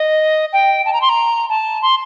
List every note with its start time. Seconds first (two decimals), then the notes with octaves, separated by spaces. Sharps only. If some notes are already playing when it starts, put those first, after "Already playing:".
Already playing: D#5
0.53 G5
0.85 A5
0.93 A#5
1.01 C6
1.09 A#5
1.49 A5
1.82 C6